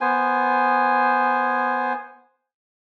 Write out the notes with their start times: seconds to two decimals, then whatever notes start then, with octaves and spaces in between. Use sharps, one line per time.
0.01 B3 C5 G#5